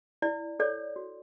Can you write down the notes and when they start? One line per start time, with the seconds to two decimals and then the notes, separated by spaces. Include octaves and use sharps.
0.22 E4 D5
0.60 A4 C#5 D5
0.96 F#4